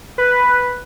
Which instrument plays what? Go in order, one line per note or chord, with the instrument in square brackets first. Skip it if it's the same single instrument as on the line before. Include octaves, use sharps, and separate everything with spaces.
[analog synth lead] B4